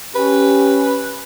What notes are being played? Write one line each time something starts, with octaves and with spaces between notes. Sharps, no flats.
C#4 G4 B4